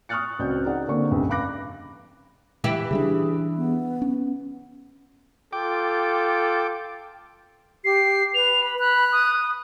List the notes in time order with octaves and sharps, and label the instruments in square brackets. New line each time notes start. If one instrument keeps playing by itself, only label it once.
[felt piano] C#6 D#6 F6 F#6 A6 C#7
C#2 C4 F#4 D5 G6
D#4 G#4 D5 F#5
D3 A#3 C4 D5 C#6
F1 C#2 G2
F5 B5 D6 F#6 A#6
[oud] E3 E4 G4
[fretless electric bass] C#3 G3 D4 [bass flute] G#4
[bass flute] B3
[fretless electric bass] C#4
[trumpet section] F4 A4 [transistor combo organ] G5 D6
[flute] G4 [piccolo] C7
[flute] B4 [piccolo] F7
[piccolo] B5
[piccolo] B5 [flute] F#6
[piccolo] D#6